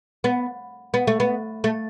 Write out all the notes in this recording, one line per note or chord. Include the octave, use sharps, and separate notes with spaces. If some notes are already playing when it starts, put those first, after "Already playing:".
B3
B3
A3
B3
A3